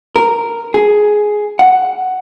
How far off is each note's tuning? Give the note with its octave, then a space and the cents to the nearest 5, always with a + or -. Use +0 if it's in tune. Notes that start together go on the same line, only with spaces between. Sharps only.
A#4 -5
G#4 +10
F#5 +5